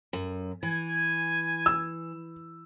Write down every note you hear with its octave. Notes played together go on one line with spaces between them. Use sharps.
F#2
E3 G#5
E6